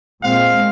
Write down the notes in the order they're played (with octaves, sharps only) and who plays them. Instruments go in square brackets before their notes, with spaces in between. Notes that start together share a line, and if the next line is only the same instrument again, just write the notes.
[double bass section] A#2 G#3 C4 [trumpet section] F5